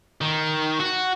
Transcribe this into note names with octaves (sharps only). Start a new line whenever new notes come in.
D#3
F#4